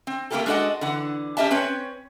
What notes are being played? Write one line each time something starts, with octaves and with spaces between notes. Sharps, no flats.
C4
A3 A#3 E4 F4 G4 A4
G#3 D4 F#4 A4 D#5 F#5
D3 E3 F#5
C#4 G4 D#5 E5 A5
C4 C#4 B4 C#5